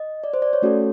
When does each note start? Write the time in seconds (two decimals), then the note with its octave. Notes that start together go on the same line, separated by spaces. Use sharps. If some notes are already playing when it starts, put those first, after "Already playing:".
Already playing: D#5
0.24 D5
0.34 C5
0.42 D5
0.53 C#5
0.62 A3 C#4 F#4 A4